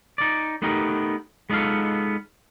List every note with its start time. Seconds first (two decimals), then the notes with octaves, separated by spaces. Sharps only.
0.18 D#4 D5
0.62 A3 B3 D#4 G4 A#4
1.50 G#3 B3 D#4 F4 A4 F5